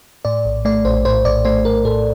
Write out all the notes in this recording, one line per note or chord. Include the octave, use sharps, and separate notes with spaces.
A2 D5
A#1
A3 D5
A#1 C5
A2 C5
A#1 D5
A3 C5
A#1 A#4
A2 A4